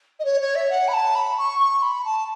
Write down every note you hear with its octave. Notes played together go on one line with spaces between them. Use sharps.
D#5
C#5
C#5
E5
F#5
B5
A5
B5
C#6
C#6
B5
A5